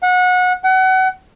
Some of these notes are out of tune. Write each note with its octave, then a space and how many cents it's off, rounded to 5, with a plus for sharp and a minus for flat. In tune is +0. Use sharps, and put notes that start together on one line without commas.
F#5 -25
F#5 +30